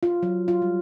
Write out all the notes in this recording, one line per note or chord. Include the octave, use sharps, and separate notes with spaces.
F4
F#3
F4
G3